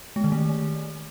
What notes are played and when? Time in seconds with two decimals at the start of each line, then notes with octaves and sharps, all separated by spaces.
0.16 G#3
0.24 D#3
0.32 A3